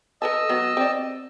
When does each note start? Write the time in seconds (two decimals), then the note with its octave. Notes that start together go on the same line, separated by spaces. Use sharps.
0.22 A4 B4 D#5 A5 E6
0.49 F#3 B3
0.77 C4 D5